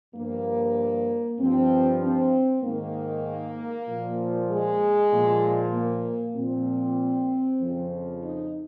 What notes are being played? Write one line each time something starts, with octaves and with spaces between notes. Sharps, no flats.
G2 F3 A#3
G2 F3 C4
C4
G#2 D#3 A#3
A#2 F3
G#3
A#2 F3
A#3
A#2 F3 C4
F2 C#3 F3
D#4